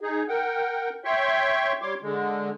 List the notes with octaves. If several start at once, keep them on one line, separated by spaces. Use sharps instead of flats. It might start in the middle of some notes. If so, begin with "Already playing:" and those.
D#4 G#4
A#4 F#5 G5
C#5 E5 G5 C6 C#6
G3 C#5 C6 D6
D3 G#3